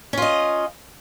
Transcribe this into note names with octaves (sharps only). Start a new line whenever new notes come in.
C#4 F4 D#5